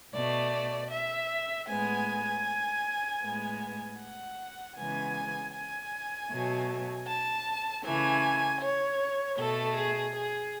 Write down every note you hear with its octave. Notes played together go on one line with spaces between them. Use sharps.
B2 A3 D5
E5
A2 G#3 B3 G#5
A2 G#3 B3
F#5
C#3 E3 G#3 B3 G#5
G#5
B2 F#3 A3
A5
C#3 E3 A3 G#5
C#5
B2 A3 A4
G#4
G#4